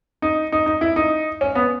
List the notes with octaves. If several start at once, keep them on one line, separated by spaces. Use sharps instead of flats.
D#4
D#4
D#4
E4
D#4
C#4
B3